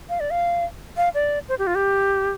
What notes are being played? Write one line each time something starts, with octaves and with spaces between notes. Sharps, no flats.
F5
D5
F5
F5
D5
C5
G4
F4
G4